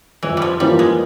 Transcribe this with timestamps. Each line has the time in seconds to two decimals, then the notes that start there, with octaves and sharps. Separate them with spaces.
0.23 F2 E3
0.37 F3 G3
0.60 E3 G3 A#3 F4 C5
0.79 G#3